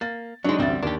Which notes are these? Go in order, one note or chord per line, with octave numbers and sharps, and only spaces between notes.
A#3 A6
F#3 G#3 D4 D#4
A1 D2 G3 C4 A6
D#2 D4 G4